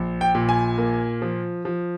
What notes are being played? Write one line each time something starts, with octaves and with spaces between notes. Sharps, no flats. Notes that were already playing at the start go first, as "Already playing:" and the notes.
Already playing: A#1
G5
A#2
G#5
A#3
F3
F3